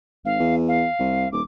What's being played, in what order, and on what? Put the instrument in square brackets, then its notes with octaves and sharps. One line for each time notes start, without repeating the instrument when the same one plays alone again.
[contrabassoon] G#1 [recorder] F5
[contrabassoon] E2
[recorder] F5
[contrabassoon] C2
[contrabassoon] D#1 [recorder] D6